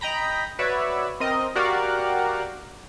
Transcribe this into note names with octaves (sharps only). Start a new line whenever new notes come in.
D#5 G5 A#5 B5
F#4 B4 C#5 D5 E5
C4 A#4 D#5
F#4 G4 A#4 D5 F5 F#5